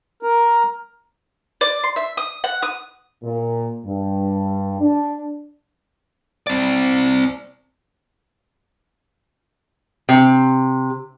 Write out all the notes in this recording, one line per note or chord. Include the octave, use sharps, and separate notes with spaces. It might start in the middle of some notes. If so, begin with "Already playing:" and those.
A#4
D5
C6
E5
D#6
F#5
D#6
A#2
G2
D4
C4 D5
C3